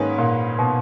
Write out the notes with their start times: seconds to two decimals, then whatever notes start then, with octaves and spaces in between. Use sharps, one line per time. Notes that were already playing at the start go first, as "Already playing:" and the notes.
Already playing: G#2 D#3 A#3 C#4 G#4 B4
0.18 A#2
0.59 B2